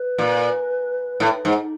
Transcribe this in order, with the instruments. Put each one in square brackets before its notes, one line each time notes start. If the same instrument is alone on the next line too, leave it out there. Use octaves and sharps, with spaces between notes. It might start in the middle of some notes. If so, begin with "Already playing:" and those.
Already playing: [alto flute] B4
[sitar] A#2
A2
G#2